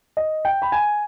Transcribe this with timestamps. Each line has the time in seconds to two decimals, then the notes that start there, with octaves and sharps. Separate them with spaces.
0.17 D#5
0.45 G5
0.62 B5
0.72 G#5